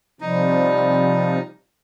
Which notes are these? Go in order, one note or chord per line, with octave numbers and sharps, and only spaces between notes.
C3 F3 G3 D#4